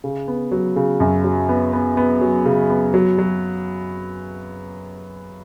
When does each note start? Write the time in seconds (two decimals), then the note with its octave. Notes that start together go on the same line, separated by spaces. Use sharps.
0.04 C#3
0.28 B3
0.51 F#3
0.76 C#3
1.00 F#2
1.24 F#3
1.49 B3
1.73 B3
1.97 B3
2.21 F#3
2.46 C#3
2.70 B3
2.94 F#3
3.18 F#3